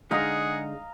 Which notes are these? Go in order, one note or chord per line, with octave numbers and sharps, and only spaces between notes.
D3 G#3 D#4 G#4 D#5 F5 F#5 A#5